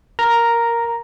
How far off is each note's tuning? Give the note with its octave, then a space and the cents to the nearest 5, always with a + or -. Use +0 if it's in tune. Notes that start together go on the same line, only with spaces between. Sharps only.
A#4 +0 A#5 +0